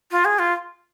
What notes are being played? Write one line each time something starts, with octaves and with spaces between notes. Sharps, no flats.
F4
G#4
F4